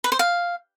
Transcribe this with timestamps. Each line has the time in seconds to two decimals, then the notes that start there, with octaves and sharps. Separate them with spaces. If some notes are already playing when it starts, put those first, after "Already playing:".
0.04 B4
0.12 C5
0.19 F5